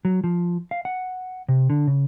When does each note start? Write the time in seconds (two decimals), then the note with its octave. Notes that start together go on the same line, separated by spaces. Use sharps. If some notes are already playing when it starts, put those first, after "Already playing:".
0.05 F#3
0.24 F3
0.71 F5
0.85 F#5
1.49 C3
1.70 D3
1.87 C#3